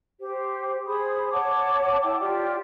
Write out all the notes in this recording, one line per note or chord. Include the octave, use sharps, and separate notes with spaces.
G4 C5
G#4 C5 B5 D#6
C#5 F#5 A5 D6
E4 G5 A5 D6
F4 G4 D5 G5